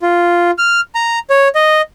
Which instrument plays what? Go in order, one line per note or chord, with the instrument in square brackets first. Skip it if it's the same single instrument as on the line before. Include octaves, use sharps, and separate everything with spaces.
[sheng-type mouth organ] F4
F6
A#5
C#5
D#5